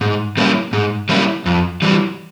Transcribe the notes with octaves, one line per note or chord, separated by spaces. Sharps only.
G#2
G3 A#3 C#4 E4
G#2
G3 A#3 C#4 E4
F2
E3 G3